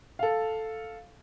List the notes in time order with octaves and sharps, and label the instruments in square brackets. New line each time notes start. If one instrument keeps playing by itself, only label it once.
[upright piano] A4 F5